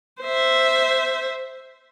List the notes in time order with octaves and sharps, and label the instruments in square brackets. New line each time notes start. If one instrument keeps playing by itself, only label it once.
[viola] C5 E5